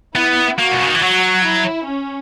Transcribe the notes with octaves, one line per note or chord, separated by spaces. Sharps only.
B3 E4
A#3 F#4
B2
C#3
D#3
E3
F#3 F#4
E4
C#4